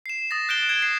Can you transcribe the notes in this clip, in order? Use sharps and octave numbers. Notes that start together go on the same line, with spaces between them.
C7 E7
D#6 A6 A#6
F#6 G6 C7 D7 E7 G7
G#6 E7 G7
C7